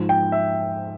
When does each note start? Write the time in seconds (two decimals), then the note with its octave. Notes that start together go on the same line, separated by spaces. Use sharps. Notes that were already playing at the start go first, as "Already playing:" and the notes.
Already playing: G#2 F3
0.09 G5
0.32 E5